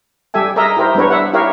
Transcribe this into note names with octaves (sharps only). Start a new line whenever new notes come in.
G3 G4 A4 E5 G#5
G#4 A#4 D#5 E5 A#5
E4 G4 A#4 C5
G3 B3 D4 B4 C#5
E5 F#5
E4 G4 A#4 C#5 F5